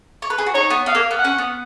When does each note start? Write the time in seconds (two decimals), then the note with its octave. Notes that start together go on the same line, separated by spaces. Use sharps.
0.22 C#5
0.30 B4
0.38 G#4
0.46 F#4
0.54 D#4 C#5
0.70 B3
0.86 B3 F5
0.95 A#3
1.11 B3
1.18 F#5
1.25 C#4
1.38 B3